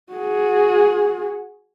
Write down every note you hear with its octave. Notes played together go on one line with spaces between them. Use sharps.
F#4 G#4